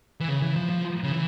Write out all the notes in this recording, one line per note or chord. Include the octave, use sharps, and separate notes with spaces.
E3
C#3
E3
F3
F3
C#3
E3